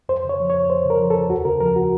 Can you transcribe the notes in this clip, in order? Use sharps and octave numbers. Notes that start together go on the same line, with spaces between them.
F2 C5
C#3
C#5
F3
C#5
F2
F2 C5
C#3
A#4
F3
A4
F2
D#2 F#4
C#3 A#4
F3 A#4
F#4